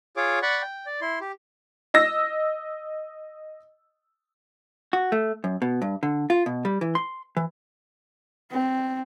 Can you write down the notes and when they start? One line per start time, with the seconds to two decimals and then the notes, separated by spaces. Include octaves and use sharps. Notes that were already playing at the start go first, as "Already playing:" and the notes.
0.17 F4 G#4 C#5 D6
0.42 D5 F#5 B5 C#6
0.62 G5
0.86 D5
1.01 E4 C6
1.21 G4
1.94 D#5 E6 A#6
4.93 F#4
5.12 A3
5.44 F#2
5.62 B2
5.82 G2
6.03 D3
6.30 F4
6.46 B2
6.65 G3
6.81 E3
6.95 C6
7.37 E3
8.52 C4